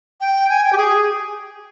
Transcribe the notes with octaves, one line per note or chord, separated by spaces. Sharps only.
G5
G#5
G5
G4
G#4